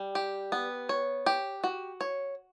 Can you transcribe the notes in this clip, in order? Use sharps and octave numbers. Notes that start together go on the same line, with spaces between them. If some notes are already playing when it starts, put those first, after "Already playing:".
Already playing: G3
G4
B3
C#5
G4
F#4
C#5